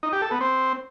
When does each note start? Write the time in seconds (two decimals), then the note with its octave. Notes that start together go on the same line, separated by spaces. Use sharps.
0.03 D#4
0.12 G4
0.22 A4
0.31 B3
0.41 C4